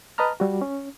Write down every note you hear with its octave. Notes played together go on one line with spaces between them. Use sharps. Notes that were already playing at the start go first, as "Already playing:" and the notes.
B4 D#5 A5 A#5 F6
G3 F#4
C#4